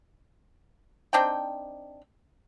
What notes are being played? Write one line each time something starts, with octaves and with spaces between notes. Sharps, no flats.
C4 D4 D#4 G5